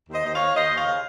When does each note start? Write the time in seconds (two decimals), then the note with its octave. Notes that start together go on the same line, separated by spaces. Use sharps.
0.08 D#2 C5 D#5
0.24 D#2 D#5
0.34 C#5 F5
0.39 D#2
0.55 D#2 C5 D#5
0.70 D#2
0.75 C#5 F5
0.87 C#3